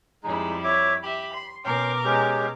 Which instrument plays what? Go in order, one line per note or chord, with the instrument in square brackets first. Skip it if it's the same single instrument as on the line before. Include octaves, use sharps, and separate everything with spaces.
[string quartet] F2 G3 E4 [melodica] G#3 D#4
[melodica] C#5 E5 D6
[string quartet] G4 E5 [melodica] B5
[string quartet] C6
[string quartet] B2 A#4 D6 [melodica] C#4 G5 C6
[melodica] G#3 C#4 G4